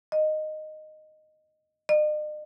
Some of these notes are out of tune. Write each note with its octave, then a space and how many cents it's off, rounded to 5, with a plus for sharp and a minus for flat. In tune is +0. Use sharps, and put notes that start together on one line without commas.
D#5 -10
D#5 -45